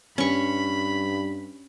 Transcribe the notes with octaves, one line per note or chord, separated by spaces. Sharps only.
G2 C#4 B5 C#6